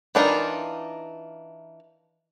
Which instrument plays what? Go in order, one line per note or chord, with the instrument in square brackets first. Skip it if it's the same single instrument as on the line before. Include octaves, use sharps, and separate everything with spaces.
[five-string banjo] E3 D4 D#4 F4 A#4